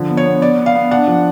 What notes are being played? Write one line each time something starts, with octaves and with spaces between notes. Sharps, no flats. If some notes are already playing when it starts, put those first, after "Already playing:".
Already playing: D3 F3
B3
C#5
B3
B3 D5
B3
F5
B3
D4 F#5
F3